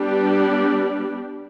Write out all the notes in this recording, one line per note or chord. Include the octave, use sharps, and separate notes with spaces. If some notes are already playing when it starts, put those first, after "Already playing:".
Already playing: G3 B3 D4 G4